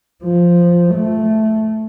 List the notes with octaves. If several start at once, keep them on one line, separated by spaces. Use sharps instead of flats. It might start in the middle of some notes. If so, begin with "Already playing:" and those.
F3
A3